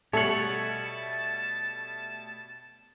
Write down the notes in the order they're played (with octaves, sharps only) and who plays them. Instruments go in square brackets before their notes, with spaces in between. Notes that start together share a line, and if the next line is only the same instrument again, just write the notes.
[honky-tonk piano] B2 G3 A3 [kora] A4 [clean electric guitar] C#5 F#5 [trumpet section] A5